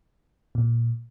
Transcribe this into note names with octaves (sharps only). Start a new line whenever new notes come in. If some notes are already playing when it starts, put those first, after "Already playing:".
A#2